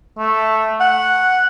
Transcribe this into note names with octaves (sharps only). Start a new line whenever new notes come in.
A3
F#5